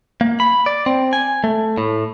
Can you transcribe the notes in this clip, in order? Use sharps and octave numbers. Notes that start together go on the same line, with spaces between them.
A#3
B5
D5
C4
G#5
A3
A2